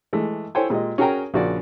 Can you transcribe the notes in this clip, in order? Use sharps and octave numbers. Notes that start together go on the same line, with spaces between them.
E3 G#3 A3
E4 A4 C5 C#5 G5 G#5
A#2 G#3 G4 D#5
C#4 F#4 G#4 A#4 G5 A#5
A#1 C#3 F#4 A#4 D5